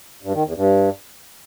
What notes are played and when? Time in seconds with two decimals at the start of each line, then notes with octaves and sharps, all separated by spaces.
0.23 G2
0.34 D#3
0.45 E2
0.56 G2